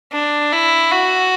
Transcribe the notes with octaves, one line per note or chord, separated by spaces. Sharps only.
D4
E4
F#4